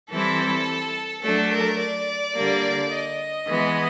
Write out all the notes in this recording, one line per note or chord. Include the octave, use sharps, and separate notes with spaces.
E3 G3 C4 E4 A4
F#3 A3 D4 A4
A#4
D5
D3 G3 A#3
D#5
E3 G#3 B3